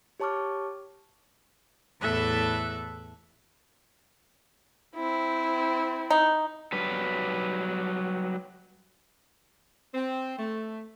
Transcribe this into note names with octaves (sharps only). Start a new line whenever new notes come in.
G4 C#5 A5 C#6 D6 F6
E2 A2 A4 E5 F#6
C4 E4
D#4
F#3 G3 B4
C4
A3